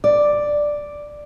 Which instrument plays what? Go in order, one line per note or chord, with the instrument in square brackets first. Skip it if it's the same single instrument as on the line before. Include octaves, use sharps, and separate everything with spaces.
[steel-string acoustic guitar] D5